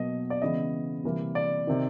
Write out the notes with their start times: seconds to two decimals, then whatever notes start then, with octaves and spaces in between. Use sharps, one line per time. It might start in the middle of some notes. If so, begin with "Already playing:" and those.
Already playing: B2 F#3 A#3 D#5
0.30 D5
0.42 C#3 E3 G#3 B3 D#5
1.04 C3 E3 G3 A#3
1.35 D5
1.67 C3 D#3